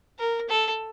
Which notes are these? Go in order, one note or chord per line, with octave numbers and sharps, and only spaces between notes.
A#4
A4